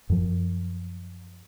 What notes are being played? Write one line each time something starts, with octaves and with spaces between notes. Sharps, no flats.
F#2 F3